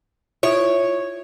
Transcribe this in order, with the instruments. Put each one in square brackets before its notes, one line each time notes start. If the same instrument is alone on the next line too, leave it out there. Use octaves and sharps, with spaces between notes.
[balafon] E4 F4 E5 [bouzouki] C#5